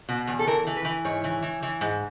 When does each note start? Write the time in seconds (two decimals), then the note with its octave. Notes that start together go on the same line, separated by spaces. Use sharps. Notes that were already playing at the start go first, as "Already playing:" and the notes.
0.09 B2
0.27 E2
0.39 A4
0.47 E3 A#4
0.67 E3
0.76 B4
0.85 E3
1.05 G#2 C#5
1.24 E3
1.42 E3
1.63 E3
1.81 G#2